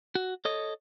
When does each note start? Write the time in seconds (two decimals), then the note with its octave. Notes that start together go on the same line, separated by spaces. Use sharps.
0.15 F#4
0.45 A4 C#5 D#5